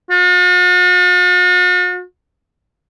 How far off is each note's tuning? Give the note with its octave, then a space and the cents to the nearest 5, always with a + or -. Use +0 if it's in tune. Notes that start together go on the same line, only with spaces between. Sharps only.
F#4 -45